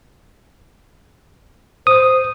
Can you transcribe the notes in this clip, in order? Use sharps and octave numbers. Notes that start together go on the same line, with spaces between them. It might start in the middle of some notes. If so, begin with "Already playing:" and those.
C5 D#6